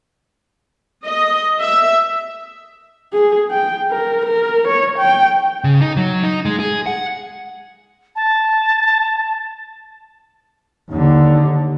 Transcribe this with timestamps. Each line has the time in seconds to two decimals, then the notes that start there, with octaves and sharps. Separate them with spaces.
1.05 D#5
1.61 E5
3.13 G#4
3.51 G5
3.92 A#4
4.25 A#4
4.68 C#5
4.99 G5
5.64 C#3
5.81 D#4
5.97 F#3
6.24 D#4
6.45 G#3
6.59 G#4
6.86 F#5
8.16 A5
10.91 D#2 D3